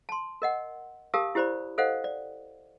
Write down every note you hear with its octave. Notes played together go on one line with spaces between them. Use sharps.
A5 C6
A#4 D#5 F#5
G4 A#4 F5 A5 D#6
E4 G4 C5 D5 B5
A4 C5 D#5 F5 F#5
D5